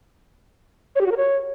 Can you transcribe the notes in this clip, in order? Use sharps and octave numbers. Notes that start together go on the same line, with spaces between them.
C#5
G4
F#4
A#4
C#5